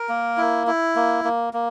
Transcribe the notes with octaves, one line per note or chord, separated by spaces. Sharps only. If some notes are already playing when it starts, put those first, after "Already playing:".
Already playing: A#4
A#3
E4
E4
A#3
A#3
A#3